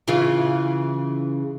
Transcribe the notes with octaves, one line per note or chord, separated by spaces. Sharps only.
C#3 E3 F4